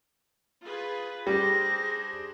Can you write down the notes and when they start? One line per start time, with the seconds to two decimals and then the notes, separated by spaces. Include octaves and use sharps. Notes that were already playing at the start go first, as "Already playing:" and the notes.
0.64 F4 G#4 B4
1.27 G3 D4 G#4 C5 A#6